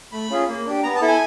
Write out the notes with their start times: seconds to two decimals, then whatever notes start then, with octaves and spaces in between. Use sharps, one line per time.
0.12 A3 B5
0.30 C#4 F4 G#4
0.48 A#3
0.66 D4 G4
0.83 B3 A#5
0.96 A5
1.02 E4 A4
1.08 G#5